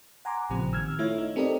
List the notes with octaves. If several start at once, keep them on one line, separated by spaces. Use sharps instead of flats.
F#5 G#5 A#5 C6 D6
A1 A#2 C#3 F3 C4 G4
D#3 E6 F6 G#6
A3 E4 F4 C#5 E5
D#4
C4 G4 A4 A#4 D5 D#5